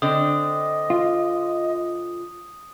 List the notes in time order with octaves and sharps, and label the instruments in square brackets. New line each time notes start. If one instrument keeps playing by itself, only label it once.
[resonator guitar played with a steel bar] D3 C4 [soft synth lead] D#5 [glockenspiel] D#6
[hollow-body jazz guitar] F4